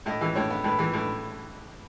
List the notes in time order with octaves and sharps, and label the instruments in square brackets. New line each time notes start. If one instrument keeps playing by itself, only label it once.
[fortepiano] A2 D#5
E3
A2 C#5
B3
A2 B4
E3
A2 B4